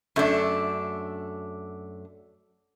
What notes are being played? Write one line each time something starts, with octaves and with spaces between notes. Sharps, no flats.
F#2 A3 D4